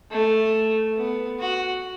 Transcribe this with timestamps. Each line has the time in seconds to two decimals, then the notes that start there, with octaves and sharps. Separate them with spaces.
0.12 A3
0.97 B3
1.40 F#4